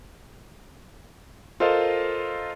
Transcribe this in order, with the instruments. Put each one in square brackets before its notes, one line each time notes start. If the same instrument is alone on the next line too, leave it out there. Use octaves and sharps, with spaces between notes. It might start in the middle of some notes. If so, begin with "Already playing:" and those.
[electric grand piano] F4 A4 A#4 C5 D#5 F5